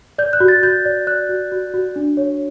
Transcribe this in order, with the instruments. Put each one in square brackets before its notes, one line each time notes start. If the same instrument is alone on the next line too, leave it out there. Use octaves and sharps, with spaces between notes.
[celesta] D5 G6
F#6
F#4
A6
F#4 G6
D5
D5 F#6
F#4
F#4
F#4
D4
C#5